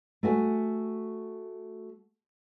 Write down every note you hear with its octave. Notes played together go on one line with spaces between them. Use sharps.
A3 F#4 G#5